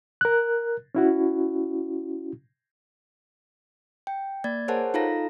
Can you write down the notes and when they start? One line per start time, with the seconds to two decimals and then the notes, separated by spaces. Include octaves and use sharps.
0.21 A#4 F#6
0.95 C#4 E4 F#4
4.07 G5
4.44 A#3 D5 G#6 A6
4.68 G#4 A#4 C5 C#5 F#5 A5
4.94 D#4 F4 A4 F5 A#5 A#6